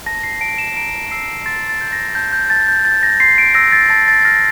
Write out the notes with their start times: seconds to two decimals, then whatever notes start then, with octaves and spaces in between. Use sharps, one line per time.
0.06 A5 A#6
0.23 C7
0.41 A5 D7
0.58 E7
0.76 A#5 D7
1.11 E6 C7
1.46 C6 A6
1.69 A6
1.81 G6
1.93 A#6
2.15 A5 G6
2.33 G6
2.50 A5 A6
2.68 G6
2.85 G6 A6
3.03 A#6
3.20 C6 C7
3.38 D7
3.55 E6 A#6
3.72 A6
3.90 A5 A6
4.08 A6
4.21 A6
4.25 F6 A#6